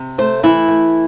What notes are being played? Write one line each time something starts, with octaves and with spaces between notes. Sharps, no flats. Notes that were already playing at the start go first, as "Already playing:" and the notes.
Already playing: C3
A3 C5
E3 E4
A3